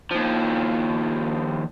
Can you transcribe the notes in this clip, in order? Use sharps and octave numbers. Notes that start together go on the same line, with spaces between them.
D#2 F3